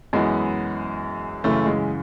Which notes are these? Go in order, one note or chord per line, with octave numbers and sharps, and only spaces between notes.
F#2 E3 G#3 B3
F#2 C#3 E3 A3
G#3